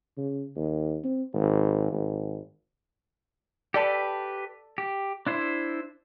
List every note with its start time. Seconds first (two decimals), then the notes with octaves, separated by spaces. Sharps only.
0.17 C#3
0.56 D#2
1.04 C4
1.34 G#1
1.92 G#1
3.74 G4 A4 B4 D5 A5
4.78 G4
5.26 D4 E4 C5